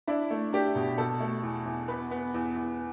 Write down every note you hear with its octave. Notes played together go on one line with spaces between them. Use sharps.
D4 E4
A3
D4 G4
B2
B2 A4
A3
E2
E2
B3 B4
B3
E2
E2